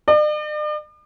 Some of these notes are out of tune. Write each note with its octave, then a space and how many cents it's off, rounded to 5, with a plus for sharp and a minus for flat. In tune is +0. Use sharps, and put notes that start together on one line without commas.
D5 +45